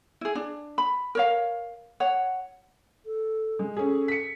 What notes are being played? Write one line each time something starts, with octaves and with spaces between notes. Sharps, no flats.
E4 G#4
D4
B5
A#4 C#5 F5
C#5 F#5
A4
G#3
C#4 G#4 A4
B6 C#7